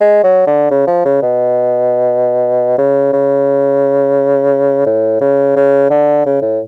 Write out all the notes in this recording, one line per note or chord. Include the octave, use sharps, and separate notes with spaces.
G#3
F#3
D3
C#3
F3
C#3
B2
C#3
C#3
A2
C#3
C#3
D3
C#3
A2